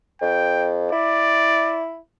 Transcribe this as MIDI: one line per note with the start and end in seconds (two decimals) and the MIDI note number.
0.22 0.89 41
0.22 0.69 79
0.92 1.97 64
0.92 1.83 74